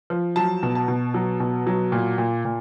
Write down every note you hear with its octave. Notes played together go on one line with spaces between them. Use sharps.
F3
F#3 A5
B2
A5
B2
F#3
B2
F#3
A#2
A#2
A#2